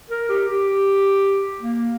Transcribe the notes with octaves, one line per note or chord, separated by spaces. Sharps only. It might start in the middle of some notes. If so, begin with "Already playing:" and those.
A#4
G4
G4
A#3